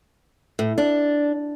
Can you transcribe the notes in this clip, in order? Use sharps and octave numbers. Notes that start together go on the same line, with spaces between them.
A2
D4